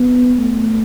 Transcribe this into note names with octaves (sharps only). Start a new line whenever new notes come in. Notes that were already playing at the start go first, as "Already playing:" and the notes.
Already playing: B3
A3